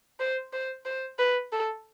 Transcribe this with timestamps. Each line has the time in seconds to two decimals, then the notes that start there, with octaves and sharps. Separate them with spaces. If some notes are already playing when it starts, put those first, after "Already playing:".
0.20 C5
0.53 C5
0.86 C5
1.19 B4
1.52 A4